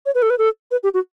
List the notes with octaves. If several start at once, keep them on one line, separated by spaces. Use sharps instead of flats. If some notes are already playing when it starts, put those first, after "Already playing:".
C#5
B4
A4
B4
A4
B4
G4
F#4